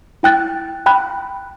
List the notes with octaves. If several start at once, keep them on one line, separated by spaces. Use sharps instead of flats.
E4 G5 F#6 A6
G5 B5 F#6